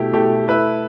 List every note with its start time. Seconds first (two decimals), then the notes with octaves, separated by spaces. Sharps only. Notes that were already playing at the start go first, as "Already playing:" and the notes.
Already playing: B2 A3 E4 G4
0.12 B2 A3 E4 G4
0.47 A3 E4 B4 E5